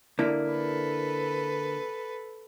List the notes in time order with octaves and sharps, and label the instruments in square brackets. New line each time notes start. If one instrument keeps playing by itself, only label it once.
[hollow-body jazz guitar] D3 A#3 E4
[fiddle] A4 B4